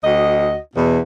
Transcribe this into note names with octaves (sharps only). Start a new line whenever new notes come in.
D2 F#4 D#5
E2 B2